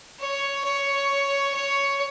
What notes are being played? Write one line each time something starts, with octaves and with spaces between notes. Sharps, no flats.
C#5
C#5
C#5